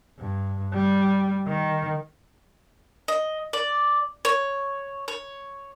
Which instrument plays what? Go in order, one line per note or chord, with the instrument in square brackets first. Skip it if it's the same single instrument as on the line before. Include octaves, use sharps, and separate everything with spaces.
[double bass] G2
G3
D#3
[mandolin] D#5
D5
C#5
C#5